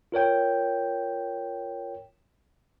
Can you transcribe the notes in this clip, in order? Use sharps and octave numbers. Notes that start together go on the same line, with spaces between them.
F4 A#4 C#5 G5